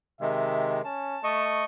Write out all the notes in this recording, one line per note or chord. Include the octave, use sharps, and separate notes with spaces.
C3 D#3 G#3 E5
C#4 A5
A3 D#5 C#6